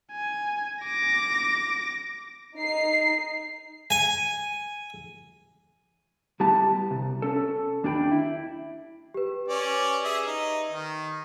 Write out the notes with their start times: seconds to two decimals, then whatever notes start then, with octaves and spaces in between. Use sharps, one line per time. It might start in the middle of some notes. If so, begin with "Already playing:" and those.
0.12 G#5
0.84 D6 A#6
2.57 D#4 C7
3.90 G#5
6.40 G3 B3 E4 G4 A5
6.91 C2
7.22 C#4 A4
7.83 D#2 D4 F#4 G#4 G5 B5
8.11 E4
9.14 G4 B4
9.48 C#4 D5
10.04 G#4 E5
10.27 D#4
10.71 D#3